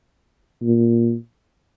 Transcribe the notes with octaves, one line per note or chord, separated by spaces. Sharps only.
A#2